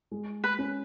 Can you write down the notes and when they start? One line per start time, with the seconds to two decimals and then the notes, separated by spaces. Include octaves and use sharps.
0.11 G#3
0.44 B4
0.59 C#4